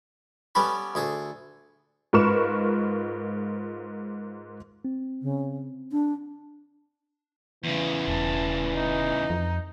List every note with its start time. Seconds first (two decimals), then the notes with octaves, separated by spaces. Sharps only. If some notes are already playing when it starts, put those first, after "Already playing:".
0.55 G3 B3 C#4 A4 B4
0.95 D2 G#4 A4
2.13 G#2 F4 A#4 B4 C#6 E7
4.85 C4
5.22 C#3
5.92 D4
7.64 E2 C#3 E3
8.08 E1 A5
8.74 D#4
9.30 F2